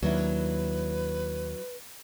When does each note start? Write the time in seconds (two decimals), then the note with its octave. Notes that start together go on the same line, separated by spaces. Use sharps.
0.03 D#2 F#3 D4 E4 B4